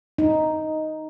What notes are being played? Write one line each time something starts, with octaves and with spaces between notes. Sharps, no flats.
D#4